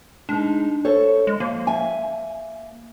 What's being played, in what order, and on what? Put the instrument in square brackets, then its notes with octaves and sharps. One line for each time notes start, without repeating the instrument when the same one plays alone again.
[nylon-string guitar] G#3 D#4 [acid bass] D4
[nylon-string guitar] A4 C5 C#5
[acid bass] G#3
[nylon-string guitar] F3 [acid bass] A#3
[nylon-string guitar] E5 G#5